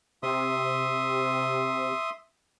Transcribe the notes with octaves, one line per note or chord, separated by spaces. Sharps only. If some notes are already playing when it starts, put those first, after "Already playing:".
C3 E5 C6 D#6